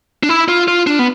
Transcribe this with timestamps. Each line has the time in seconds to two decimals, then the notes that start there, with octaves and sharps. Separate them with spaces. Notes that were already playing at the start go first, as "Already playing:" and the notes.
0.23 D4
0.29 E4
0.48 F4
0.68 F4
0.87 D4
0.99 B3